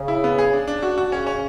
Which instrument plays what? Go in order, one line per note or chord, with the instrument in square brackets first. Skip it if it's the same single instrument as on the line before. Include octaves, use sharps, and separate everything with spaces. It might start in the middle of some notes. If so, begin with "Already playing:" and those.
Already playing: [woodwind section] C#3
[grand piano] E4
B3
G#4
D4
D4
F#4
F#4
[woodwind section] C#3 [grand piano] C#4
[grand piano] C#4